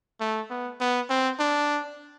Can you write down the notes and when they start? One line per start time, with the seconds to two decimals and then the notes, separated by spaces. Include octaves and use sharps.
0.20 A3
0.50 B3
0.80 B3
1.10 C4
1.40 D4